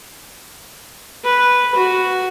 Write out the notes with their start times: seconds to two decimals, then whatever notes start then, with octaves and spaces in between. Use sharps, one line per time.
1.24 B4
1.75 F#4